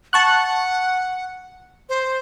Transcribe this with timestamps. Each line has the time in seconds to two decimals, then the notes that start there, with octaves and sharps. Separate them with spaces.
0.13 F#5 A5 C#6 F#6
1.89 C5